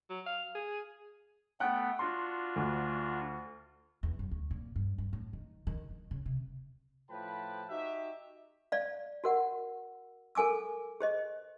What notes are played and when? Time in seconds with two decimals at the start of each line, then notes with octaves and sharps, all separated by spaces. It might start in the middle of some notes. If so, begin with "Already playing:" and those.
0.10 F#3
0.26 F5
0.55 G#4
1.60 A3 B3 F#5 G5 F#6
1.99 D4 F4 F#4 C6
2.56 D2
4.03 E2
4.19 F#2
4.31 D2
4.51 A#2
4.76 G2
4.98 G2
5.13 A2
5.33 D#3
5.67 D#3
5.90 D#3
6.11 C#3
6.26 C3
7.10 A2 F3 B4 G5 A5 B5
7.68 D#4 F#4 G4 E5
8.72 D5 F5
9.24 F#4 A#4 F#5
10.35 A4 A#4 G#5 D6 E6
11.00 G#4 C5 D#5